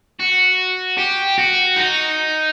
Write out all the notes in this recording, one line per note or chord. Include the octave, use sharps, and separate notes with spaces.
F#4
G4
F#4
D#4